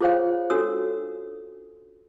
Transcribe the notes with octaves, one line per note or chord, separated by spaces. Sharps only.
F4 G#4 C5 C#5 F5 G5
C#4 D4 F#4 A4 C#5 E6